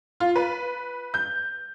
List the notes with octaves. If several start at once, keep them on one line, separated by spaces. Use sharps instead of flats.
F4
B4
G6